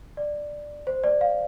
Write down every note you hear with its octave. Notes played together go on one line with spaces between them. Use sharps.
D5
C5
D5
F5